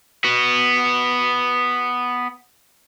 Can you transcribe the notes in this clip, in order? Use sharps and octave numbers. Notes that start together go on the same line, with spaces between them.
B3 F#4